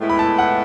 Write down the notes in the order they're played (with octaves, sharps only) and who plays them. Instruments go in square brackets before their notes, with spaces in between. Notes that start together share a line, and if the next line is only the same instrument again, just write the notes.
[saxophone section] A2 G#3 B3 E4
[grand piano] B5
A5
F#5